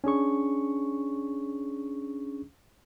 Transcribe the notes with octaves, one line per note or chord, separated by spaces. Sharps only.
C#4 D4 G#4 C#6